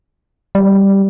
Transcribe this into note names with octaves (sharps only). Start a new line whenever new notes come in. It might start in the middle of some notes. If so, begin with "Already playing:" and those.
G3